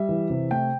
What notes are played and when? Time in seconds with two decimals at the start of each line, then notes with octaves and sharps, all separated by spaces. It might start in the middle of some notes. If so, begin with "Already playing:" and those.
Already playing: G3 E5
0.09 E3
0.30 C3
0.51 A3 G5